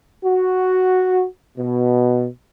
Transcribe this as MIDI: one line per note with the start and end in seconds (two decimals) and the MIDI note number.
0.24 1.24 66
1.57 2.27 47